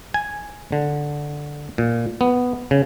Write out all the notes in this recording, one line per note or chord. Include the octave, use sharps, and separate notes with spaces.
G#5
D3
A#2
B3
C#3